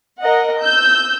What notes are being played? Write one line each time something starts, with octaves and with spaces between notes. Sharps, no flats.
A#4 D#5 F#5
E6 G6